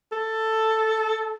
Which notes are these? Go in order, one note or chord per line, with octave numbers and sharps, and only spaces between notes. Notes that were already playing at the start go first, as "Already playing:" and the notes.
A4